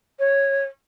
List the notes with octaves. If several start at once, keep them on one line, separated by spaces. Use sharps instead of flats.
C#5